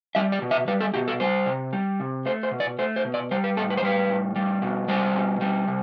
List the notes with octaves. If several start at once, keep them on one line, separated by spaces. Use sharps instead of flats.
G3 E5
D5
B2
E5
G3 B4
A4
B2 G4
A4
G3 C5
C3
G3
C3
A3 C5
C5
B2
D5
A3 C5
C5
B2
D5
G3 C5
B4
A2 A4
B4
C5
G3 B4
A2
G3
B2
G3 C5
B2
G3
C3